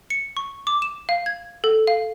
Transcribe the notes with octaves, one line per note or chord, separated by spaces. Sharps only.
C#7
C#6
D6
E7
F5
G#6
A4
F5